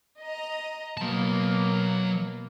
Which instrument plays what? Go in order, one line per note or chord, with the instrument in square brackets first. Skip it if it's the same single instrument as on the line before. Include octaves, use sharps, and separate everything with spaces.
[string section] D#5 A#5
[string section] B2 A#3 [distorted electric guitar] F#3 A5